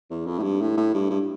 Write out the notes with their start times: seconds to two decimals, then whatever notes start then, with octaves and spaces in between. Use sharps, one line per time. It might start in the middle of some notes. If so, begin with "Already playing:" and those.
0.10 E2
0.26 F2
0.39 A2
0.43 G2
0.61 A2
0.77 A2
0.94 G2
1.11 G2